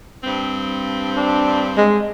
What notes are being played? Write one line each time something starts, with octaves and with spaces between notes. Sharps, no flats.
G2 C4
D4
G#3